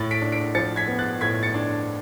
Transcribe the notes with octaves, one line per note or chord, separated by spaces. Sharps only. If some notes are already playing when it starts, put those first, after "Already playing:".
Already playing: A2 A6
B6 D7
D4
B6 D7
F3 A6 C#7
G#6 B6
B3
F#6 A6
A2 G#6 B6
A6 C#7
D4